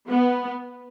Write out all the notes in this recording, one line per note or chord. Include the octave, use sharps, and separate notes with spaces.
B3